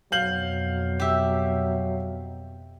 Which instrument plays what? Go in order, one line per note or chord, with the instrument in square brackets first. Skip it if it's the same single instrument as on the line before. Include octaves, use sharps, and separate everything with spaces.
[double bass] F2 B2 [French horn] F#3 [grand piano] F5 G6 F#7
[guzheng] G4 E5